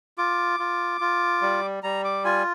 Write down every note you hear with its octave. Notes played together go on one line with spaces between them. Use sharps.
F4 D6
F4
F4
G3
G3 A#5
D6
F4 G#5